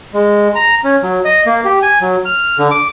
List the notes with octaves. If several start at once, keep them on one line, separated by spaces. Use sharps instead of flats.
G#3
A#5
C#4
F#3
D#5
A#3
G4
G#5
F#3
F6
D3
D6